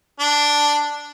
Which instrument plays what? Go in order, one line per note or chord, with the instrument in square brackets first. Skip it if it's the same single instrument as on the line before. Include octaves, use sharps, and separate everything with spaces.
[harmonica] D4